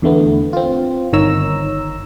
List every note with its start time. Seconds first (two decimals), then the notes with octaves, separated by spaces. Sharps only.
0.02 E2 D3 A3 B3
0.53 C4 F4
1.13 G1 D#3 C#5 A#5 E6